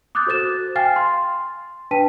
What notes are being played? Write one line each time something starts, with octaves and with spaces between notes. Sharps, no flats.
D6 D#6 F#6 G6 A6
F#4 A4 C5 F#6 A6 E7
F5 G5 G#5 F6 A6 C7
C6
D4 B4 G5 A5 B6 D#7